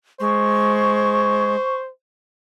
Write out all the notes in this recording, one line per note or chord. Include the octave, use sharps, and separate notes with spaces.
G#3 C5 C#6